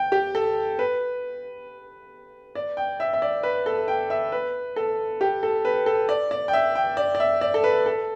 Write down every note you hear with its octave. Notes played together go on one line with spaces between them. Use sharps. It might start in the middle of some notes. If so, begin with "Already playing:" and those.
Already playing: G5
G4
A4
B4
D5
G5
E5
E5
D5
B4
A4
G5
E5
B4
A4
G4
A4
B4
A4
D5
D5
G5
E5
G5
D5
D5
E5
D5
A4
B4
A4